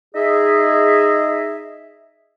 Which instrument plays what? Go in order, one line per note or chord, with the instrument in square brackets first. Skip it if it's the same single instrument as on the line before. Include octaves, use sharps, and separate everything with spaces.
[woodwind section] D#4 G#4 D#5 E5